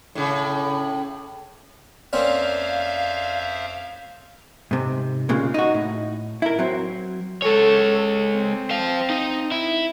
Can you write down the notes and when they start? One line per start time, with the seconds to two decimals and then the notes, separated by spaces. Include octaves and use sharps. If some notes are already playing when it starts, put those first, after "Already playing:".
0.15 A2 C#3
2.13 F2 A#3 C4 C#4 C5 D5 E5 F5
4.71 G#2 C3
5.29 A#2 C#3 G#3
5.54 D#4 F#4
5.74 A2
6.42 E4 A#4
6.59 F#3 C4
7.42 G#3 A4 C#5
8.34 C4
8.70 C5 F5
9.10 D#4
9.51 E4